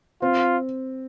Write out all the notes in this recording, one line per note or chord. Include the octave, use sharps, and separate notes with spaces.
C4 F4